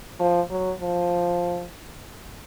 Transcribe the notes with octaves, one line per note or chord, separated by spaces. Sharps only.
F3
F#3
F3